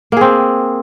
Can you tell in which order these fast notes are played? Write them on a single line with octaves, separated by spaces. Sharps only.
A#3 G#4 C4